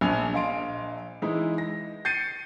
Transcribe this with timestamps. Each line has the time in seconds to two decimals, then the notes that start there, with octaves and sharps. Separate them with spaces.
0.01 A#1 G#5 F7
0.33 A#1 D#5 F5 C6 D7
1.22 E3 G#3 D#4 E4
1.58 A#6
2.05 G6 A6 C7 C#7 D#7